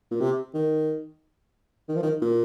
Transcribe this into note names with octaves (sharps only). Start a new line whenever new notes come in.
A#2
C3
D#3
D#3
F3
D#3
A#2